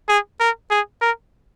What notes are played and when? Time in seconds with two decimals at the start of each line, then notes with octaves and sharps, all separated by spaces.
0.09 G#4
0.40 A#4
0.71 G#4
1.01 A#4